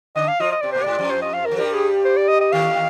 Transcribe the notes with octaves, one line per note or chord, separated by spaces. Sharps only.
D3 D4 D#5
F5
F3 F4 D#5
D#5
C3 C4 D5
A#2 A#3 C5
G#2 G#3 D5
F2 F3
C5
D#5
F5
A#4
F3
G2 G3 A#4
G#4
C5
D5
D#5
D#5
D#2 D#3 F5